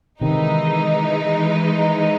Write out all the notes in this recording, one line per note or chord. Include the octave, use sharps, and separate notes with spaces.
C3 D#3 E3 G#3 D#4